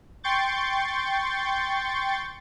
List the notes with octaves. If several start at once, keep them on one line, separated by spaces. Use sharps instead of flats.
G5 C6 C#6 G6 A6